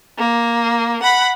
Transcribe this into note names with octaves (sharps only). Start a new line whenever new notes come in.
A#3
F#5 B5